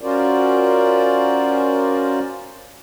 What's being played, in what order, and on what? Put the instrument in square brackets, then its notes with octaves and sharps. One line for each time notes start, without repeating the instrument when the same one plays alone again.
[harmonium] C#4 F4 F#4 A#4 C5 D5